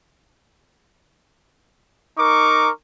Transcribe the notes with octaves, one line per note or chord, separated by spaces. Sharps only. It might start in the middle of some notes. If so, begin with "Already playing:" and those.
D#4 A#4 C#6 D6